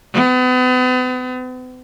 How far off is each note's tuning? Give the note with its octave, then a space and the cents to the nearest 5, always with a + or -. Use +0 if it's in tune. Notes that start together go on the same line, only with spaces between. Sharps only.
B3 +40